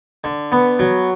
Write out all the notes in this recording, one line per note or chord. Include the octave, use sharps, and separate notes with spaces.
D3
B3
F#3